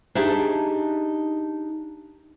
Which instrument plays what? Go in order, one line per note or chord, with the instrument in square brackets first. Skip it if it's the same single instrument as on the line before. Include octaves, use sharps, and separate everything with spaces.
[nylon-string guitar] D4 D#4 G4 G#4 E5 A5